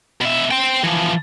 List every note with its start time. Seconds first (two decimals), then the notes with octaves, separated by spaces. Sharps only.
0.21 B2 E5
0.51 C5 G5
0.84 E3 F3